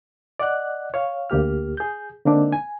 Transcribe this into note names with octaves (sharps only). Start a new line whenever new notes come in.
D5 D#5 F#5 F#6
C#5 F5
D2 A#3 G4 F6
G#4 G6
D3 G#3 A#3 C4 D4 D#4
G#5